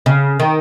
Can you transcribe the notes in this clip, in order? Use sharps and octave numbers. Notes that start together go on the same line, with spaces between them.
C#3
D#3